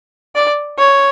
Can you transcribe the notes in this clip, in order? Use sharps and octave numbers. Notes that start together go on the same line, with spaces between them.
D5
C#5